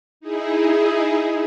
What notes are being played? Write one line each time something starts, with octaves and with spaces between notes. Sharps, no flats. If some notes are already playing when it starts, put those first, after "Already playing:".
D#4 E4 G#4